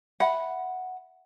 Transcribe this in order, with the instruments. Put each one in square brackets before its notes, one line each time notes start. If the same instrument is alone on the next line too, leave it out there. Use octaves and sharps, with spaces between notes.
[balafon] E5 B5 [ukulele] F#5